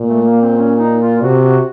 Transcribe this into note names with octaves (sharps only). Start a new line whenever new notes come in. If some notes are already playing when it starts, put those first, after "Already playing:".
Already playing: A#2
A3
A#3
C4
C#4
D#4
F4
C3 F#4
F#4